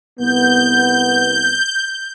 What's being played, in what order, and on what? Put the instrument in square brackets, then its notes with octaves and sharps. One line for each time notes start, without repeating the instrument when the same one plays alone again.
[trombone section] C2 B3 [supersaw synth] G6